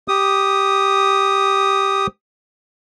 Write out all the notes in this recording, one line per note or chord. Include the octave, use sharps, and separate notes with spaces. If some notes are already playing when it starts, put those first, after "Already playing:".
G4 D#6